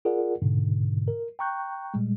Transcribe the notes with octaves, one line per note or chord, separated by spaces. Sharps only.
F4 G#4 A#4 D5 F#5
G#2 B2 D3
A#4
G5 A#5 C#6 F#6 G6
A#2 G3 G#3